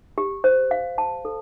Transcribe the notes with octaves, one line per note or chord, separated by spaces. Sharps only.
G4
C5
F5
A5
A4